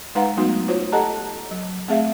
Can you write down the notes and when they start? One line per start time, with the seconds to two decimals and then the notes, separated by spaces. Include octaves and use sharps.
0.15 G#3 D#4 B4 F5 F#5 A#5
0.37 F#3 G#3 A3 B3 D#4 F#4
0.68 F4 F#4 C5 C#5
0.92 G4 A4 D#5 F#5 A5 A#5
1.51 F#3
1.88 A3 C4 G#4 E5 F5